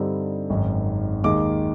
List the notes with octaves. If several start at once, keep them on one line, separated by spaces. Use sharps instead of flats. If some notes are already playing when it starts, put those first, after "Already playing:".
Already playing: G2 D3 G3 C4 D#4
G#1 F#2 D#3
D#2 D#3 G#3 D6